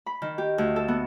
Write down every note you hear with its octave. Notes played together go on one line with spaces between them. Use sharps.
B5
D#3
G4
D2
A4
B3